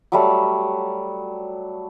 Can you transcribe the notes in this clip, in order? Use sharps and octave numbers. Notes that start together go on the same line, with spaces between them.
F#3 G3 A3